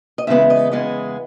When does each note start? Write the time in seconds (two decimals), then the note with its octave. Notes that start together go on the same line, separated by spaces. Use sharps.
0.18 D#5
0.27 E2 C#3 E3 G#3 B3 E5
0.50 D#5
0.71 E2 C#3 E3 G#3 B3